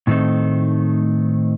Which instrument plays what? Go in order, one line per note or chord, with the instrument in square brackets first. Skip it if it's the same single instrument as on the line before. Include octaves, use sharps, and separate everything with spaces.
[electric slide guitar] A2 D#3 A3 C4 D#4